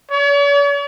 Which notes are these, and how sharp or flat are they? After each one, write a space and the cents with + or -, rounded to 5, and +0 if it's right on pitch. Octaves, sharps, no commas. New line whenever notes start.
C#5 +45